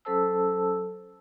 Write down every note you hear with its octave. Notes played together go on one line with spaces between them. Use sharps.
F#3 C#4 A4 C5 A5 E6